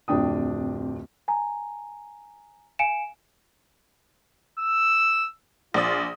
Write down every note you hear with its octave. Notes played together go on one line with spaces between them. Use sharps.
D1 F2 D4 G5 D#6
G#5 A#5
F5 G#5 C#7 D7 E7
E6
A#1 F4 D5 D#6